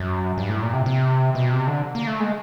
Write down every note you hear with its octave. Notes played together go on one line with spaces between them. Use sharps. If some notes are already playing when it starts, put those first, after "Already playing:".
Already playing: F#2
G2
A2
A#2
C3
C3
B2
C3
D3
A#3
A3
G#3